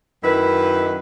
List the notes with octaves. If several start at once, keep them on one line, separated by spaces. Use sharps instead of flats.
F#2 D#3 E4 B4